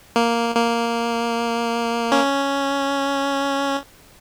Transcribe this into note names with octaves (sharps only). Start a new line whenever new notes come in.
A#3
A#3
C#4